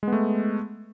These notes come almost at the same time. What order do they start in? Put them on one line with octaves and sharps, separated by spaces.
G#3 B3 A3